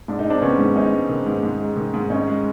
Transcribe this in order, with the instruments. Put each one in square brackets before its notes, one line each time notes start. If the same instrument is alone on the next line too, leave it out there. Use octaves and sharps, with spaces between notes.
[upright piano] G#2 [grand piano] D4
[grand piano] D#4
[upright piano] G#3 [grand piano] C4 D4
[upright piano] D#3 [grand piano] B3 C#4
[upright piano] G#2
[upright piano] G#2 [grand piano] C#4 D#4
[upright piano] G#3
D#3
G#2
G#2
G#3
D#3
G#2
[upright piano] G#2 [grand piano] C#4 D#4
[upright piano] G#3